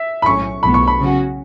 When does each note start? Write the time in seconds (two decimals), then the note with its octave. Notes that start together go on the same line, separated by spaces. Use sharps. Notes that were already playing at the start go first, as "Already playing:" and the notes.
Already playing: E5
0.22 B5
0.26 B1 A2 F#3 C#4 C#6
0.63 B1 A2 F#3 B3 B5
0.74 C#6
0.88 B5
0.99 C#3 F#3 C#4 F#4